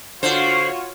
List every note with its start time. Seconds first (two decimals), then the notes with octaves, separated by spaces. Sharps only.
0.23 D3 F4 F#4 C5 C#5